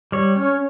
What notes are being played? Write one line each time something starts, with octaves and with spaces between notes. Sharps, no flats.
G3 C#5
C#4